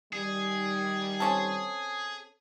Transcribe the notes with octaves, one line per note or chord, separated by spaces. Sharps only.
D#3 G3 G#4
C4 C#4 A4